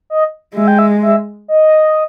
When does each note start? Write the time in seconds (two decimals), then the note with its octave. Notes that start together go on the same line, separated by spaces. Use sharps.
0.10 D#5
0.56 G#3 E5
0.68 G5
0.79 E5
1.02 E5
1.48 D#5